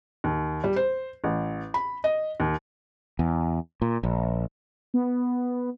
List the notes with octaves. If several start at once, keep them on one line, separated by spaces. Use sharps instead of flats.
D#2
G3
C5
A1
B5
D#5
D#2
E2
A#2
A#1
B3